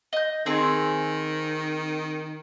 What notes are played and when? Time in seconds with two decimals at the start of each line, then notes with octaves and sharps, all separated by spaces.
0.13 D#5 G6
0.46 D#3 C4 G#4